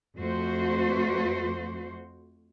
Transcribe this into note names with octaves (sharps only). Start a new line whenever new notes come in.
F2 A3 F#4 C5